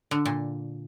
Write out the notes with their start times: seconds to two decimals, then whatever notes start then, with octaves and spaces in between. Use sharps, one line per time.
0.11 D3
0.26 A#2